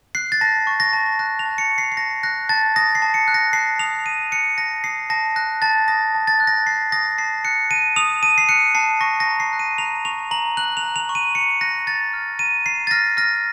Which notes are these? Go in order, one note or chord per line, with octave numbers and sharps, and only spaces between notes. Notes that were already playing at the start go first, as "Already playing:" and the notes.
F#6 C7
A6
A5 A#6
C#6
A#6
A5
F#6 A#6
F7
A5
C#7
C#6
C7
C7
A5 A#6
F#6 A#6
A5 A6
D#6 A#6
C7
A5
C#7
F#6
A#6
A5 C7
D#6 F7
A5 D#7
F#6 C#7
A5 A#6
D#6 C7
A5 A#6
F#6 A#6
A5 A6
D#6 A#6
A5
A6
F#6
A#6
A5 C7
D#6 A#6
A5 C7
F#6 C#7
A5 D#7
D#6 F7
A5 D#7
C7
F#6 C#7
A5 C7
C#6 A#6
A#6
A#5
C7
F#6
D#7
A#5 F7
C#6 F7
A#5 F#7
F#6 F#7
F7
A#5
F7
C#6
D#7
A#5 C#7
F#6 A#6
A#5 A6
F6
A#5 D#7
A#5 C7
A6
F6 A#6
F6 A#6